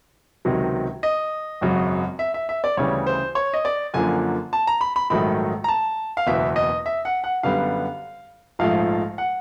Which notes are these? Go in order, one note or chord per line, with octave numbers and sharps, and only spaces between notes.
C#2 C3 D#3 F#3
D#5
G#1 F#2 C#3 F#3
E5
E5
E5
D5
D2 C#3 E3 G3 C#5
C5
C#5
D#5
D5
F#2 D3 F3 A#3 G#5
A5
A#5
B5
B5
A#1 G#2 D#3 F#3 A3 B5
A#5
A5
F5
F#1 E2 B2 E5
D#5
E5
F#5
F#5
F#2 D3 G3 B3 F5
A#1 G#2 F3 A3 F5
F#5